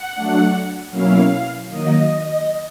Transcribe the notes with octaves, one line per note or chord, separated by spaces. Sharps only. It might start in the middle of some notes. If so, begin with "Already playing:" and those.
Already playing: F#5
F#3 A3 D4
B2 F#3 A#3 C#4 E4 F5
D#3 F#3 A#3 D#5